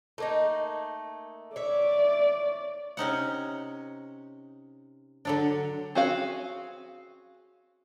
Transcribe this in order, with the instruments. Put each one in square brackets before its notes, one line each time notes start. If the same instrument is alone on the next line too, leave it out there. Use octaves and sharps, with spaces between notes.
[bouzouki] A3 A#3 D#4
[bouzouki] C#5 E5 [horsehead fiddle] D5
[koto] C3 C#4 D#4 F#5
D3 F#3 D4
[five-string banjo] C4 C#4 F#4 G#4 F5